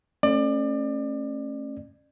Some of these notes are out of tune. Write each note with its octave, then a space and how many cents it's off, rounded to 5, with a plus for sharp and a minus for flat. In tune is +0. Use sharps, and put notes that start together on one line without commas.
A3 +15 C#4 -20 D5 +30